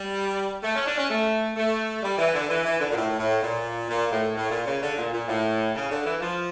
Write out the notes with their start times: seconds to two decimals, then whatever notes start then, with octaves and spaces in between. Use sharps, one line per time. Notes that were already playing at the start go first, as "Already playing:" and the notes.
Already playing: G3
0.63 A3
0.75 C#4
0.86 D4
0.98 C#4
1.09 A3
1.57 A3
2.03 G3
2.18 E3
2.33 D3
2.49 E3
2.65 E3
2.80 D3
2.90 A#2
2.96 A2
3.19 A2
3.41 A#2
3.89 A#2
4.11 A2
4.35 A2
4.50 A#2
4.66 C#3
4.81 D3
4.96 A#2
5.12 A#2
5.28 A2
5.74 C#3
5.90 D3
6.05 E3
6.20 F3